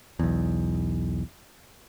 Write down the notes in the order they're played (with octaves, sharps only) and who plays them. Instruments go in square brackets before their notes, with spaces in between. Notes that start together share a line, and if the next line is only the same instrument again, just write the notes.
[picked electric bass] B1 E2